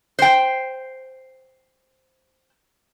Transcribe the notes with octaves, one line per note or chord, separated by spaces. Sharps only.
C5 G5